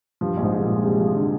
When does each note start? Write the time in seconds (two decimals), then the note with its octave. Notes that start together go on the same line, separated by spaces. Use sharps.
0.21 G2 F3
0.34 A#1 G2
0.42 G#2
0.52 G#3
0.59 G#2
0.63 A#2
0.69 F3
0.84 C3 G#3
1.00 F3
1.15 D3 F3